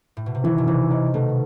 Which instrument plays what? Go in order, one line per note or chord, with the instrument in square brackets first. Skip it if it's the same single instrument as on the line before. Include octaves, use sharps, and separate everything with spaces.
[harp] A2
B2
C3
[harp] D#3 [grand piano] E3
[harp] B2
[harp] C3 [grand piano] E3
[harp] D#3 [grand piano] D#4
[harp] B2 [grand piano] A3